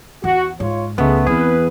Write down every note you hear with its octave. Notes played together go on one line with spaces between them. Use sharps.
E2 F#4
G#2 F4 C#5
C#2 G#3 A3 B3
E2 C4 G#4 B4